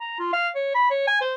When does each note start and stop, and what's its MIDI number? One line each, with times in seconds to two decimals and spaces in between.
0.01 0.16 82
0.19 0.29 65
0.33 0.48 77
0.55 0.72 73
0.75 0.89 83
0.90 1.03 73
1.08 1.19 80
1.21 1.35 72